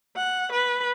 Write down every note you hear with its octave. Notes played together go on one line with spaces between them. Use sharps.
F#5
B4